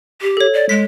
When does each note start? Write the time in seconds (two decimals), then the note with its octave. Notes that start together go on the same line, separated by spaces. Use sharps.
0.22 G4
0.37 A4 C#5
0.54 D5
0.69 G#3 B6